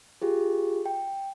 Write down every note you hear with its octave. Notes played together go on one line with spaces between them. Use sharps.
F4 G4 G#4
G5